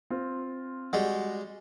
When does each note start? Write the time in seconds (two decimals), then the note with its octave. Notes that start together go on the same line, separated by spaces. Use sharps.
0.10 C4 F4
0.93 G3 G#3 F#4